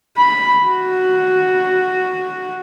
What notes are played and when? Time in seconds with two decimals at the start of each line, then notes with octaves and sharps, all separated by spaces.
0.17 B5
0.67 F#4